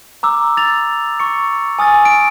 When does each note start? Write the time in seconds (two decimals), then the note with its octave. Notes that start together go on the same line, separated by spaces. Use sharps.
0.23 A#5 D6 E6
0.57 A6 F7
1.20 C#6 C#7
1.79 G#5 D#6 F6 A6
2.05 D7